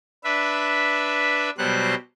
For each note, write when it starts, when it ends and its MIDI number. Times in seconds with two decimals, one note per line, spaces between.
0.24 1.50 62
0.24 1.50 71
0.24 1.50 76
1.58 1.95 47
1.58 1.95 54
1.58 1.95 55
1.58 1.95 72
1.58 1.95 90